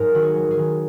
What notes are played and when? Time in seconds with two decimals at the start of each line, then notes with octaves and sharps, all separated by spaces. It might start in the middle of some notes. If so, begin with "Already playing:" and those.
Already playing: G#2 F#3 D#4 A#4
0.14 D#3 F#4
0.22 G#4
0.36 F#3
0.51 G#4
0.58 D#3